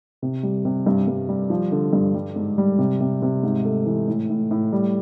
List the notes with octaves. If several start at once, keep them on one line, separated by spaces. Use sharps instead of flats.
C3
G3
C3
G2
G2
G3
F3
D3
G2
G3
G#2
G3
C3
C3
C3
G#2
A3
E3
A2
A2
A2
G3